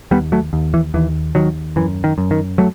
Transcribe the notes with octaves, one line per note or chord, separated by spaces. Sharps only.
D#2 G3 B3
F#3 A3
D#2
E3
D#2 E3
D#2 D#3 F#3
F#2 E3
D#3
F#2
D#3
F#3 A3